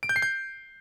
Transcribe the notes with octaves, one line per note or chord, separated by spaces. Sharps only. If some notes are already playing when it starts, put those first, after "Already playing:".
D7
G6
C7
G6